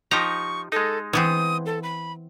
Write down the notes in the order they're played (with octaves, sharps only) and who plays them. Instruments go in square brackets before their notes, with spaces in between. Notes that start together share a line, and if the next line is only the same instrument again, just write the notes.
[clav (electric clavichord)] F3 D#4 A#5 [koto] G4 [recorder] C#6
[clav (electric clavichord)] G#3 D#4 [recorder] A4
[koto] E3 B3 C4 [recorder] D#6
[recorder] A4
B5